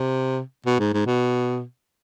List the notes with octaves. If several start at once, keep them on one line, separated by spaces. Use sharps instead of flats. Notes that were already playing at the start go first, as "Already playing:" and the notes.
Already playing: C3
B2
G#2
G#2
B2